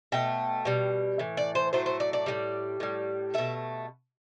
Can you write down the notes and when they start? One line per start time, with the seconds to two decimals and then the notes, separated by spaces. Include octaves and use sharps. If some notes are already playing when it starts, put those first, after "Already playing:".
0.12 B2 A3 G5
0.65 B2 G3
1.19 A2 E3
1.37 D5
1.55 C5
1.73 A2 F#3 A3 C5
1.86 C5
2.00 D5
2.13 D5
2.26 A2 E3 G3
2.80 A2 G3
3.34 B2 A3 E5